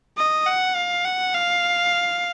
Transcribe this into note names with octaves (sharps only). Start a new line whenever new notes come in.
D#5
F#5
F5
F#5
F5